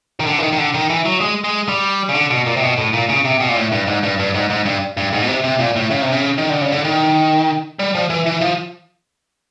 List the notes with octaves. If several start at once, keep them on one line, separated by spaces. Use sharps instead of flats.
D#3
D3
E3
D#3
D#3
D3
D#3
E3
F#3
G#3
G#3
G3
C#3
D3
B2
A#2
C3
B2
A2
A#2
C#3
C3
B2
A#2
A2
G2
G#2
G2
G2
G#2
G#2
G2
G2
G#2
B2
C3
C3
A#2
A2
C#3
C3
C#3
D#3
D3
C#3
D3
D#3
G3
F3
E3
E3
F3